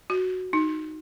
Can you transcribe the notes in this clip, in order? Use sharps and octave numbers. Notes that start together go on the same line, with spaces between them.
F#4
D#4